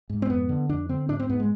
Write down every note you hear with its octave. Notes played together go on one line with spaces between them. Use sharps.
G#2
C4
F2 B3
D3
F2 D4
D3 C4
G#2 D4
C4
G#2 B3
G#3